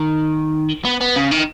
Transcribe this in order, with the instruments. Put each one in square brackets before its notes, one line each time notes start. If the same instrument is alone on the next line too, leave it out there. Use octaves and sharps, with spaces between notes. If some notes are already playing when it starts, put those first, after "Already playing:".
Already playing: [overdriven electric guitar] D#3
B3
B3
C#3
D#3